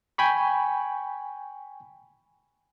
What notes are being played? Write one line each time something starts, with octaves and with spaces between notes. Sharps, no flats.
G5 G#5 B5 C#6